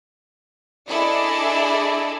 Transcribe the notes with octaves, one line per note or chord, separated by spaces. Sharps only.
D4 E4 G#4 A4 D5 D#5